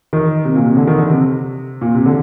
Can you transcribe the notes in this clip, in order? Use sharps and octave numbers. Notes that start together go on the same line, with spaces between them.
D#3
C3
A#2
C3
D3
D#3
D3
C3
A#2
C3
D3